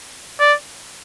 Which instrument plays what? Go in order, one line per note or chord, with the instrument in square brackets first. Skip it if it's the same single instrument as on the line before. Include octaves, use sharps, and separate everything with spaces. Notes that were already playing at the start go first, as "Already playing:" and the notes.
[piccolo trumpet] D5